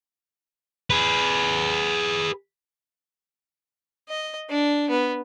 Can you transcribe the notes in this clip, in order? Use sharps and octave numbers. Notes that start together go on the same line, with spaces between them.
G#4 B4
D#5
D4
B3